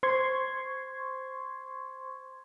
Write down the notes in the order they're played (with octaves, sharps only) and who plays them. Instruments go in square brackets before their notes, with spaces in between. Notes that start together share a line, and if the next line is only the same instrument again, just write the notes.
[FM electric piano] C5 C6 C#6 G#6